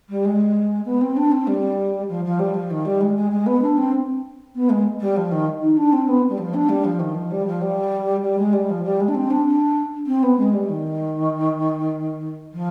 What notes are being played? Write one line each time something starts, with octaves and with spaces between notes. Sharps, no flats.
G3
G#3
B3
C4
D4
C4
G3
F3
F3
G3
F3
D#3
G3
G#3
G#3
G#3
B3
D4
C4
B3
G#3
G3
F3
D#3
D#4
D4
C4
B3
G3
F3
D4
G3
F3
D#3
F3
G3
F3
G3
G3
G#3
G3
F3
G3
G#3
D4
C4
D4
D4
C4
B3
G#3
G3
D#3
F3